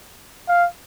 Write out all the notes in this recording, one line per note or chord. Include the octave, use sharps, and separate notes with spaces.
F5